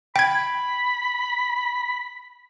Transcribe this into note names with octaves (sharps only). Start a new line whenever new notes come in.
G5 B5 G#6